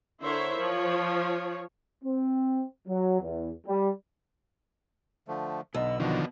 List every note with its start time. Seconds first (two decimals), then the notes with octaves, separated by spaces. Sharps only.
0.22 D3 E4 A#4 C5 C#5 E5
0.58 F3 C#5
2.04 C4
2.88 F#3
3.21 E2
3.67 G3
5.28 D3 F3 A3
5.74 B1 B2 D3 D#5 E6
6.00 F2 B2 D3 D#3 F3 F#4